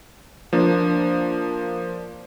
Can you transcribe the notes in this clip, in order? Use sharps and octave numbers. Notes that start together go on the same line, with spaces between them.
F3 A#3 D4